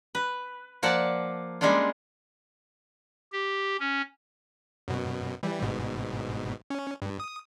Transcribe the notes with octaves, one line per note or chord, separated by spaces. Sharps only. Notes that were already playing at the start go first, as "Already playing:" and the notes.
B4
F3 A#3 D5 F#5 A5
G3 G#3 A#3 C#4 D4 F4
G4
C#4
F#2 B2
E3 G3
G1 G#2 B2
C#4
G2
D#6